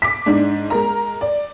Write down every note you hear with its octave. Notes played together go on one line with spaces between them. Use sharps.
D6 B6
G#2 D4
G#3 A#4 A#5
D5